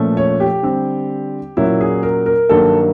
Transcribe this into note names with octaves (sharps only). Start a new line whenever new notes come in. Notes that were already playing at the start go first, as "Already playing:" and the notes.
Already playing: A#2 F3 A3 C#4
C#5
G4
D3 G3 C4
A#2 F#3 A#3 C#4 E4
G#4
A#4
A#4
G2 D#3 F#3 A#3 A4